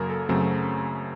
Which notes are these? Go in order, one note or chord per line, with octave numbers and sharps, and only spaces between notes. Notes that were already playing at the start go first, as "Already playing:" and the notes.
Already playing: F#2 C#3 F#3 A#3 A#4
A4
F#2 C#3 F#3 A3 C4